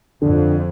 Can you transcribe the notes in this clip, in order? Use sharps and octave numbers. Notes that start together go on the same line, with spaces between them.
F2 D3